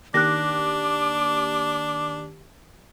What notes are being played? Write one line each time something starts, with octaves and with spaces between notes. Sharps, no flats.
D#3 A#3 D4 G4 D6 F#6 A#6